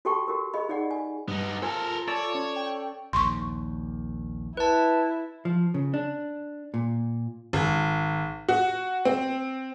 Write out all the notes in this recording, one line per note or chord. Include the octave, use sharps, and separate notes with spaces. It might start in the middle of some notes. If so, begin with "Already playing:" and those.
F#4 G4 A4 G5 A5 C#6
F#4 G4 A#4
G#4 D#5 B5
D#4 G#4 D5 F#5
G#5
G2 B3 D#4
F4 A4 A#4 C5 G#5
A4 C#5 D5 A5
C#4 C#6
G5
A#1 D#2 C6 C#6
E4 B4 A5
F3
C#3
D4
A#2
G#1
F#4
C4